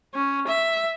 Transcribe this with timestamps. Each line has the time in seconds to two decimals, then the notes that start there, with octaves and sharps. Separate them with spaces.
0.14 C#4
0.47 E5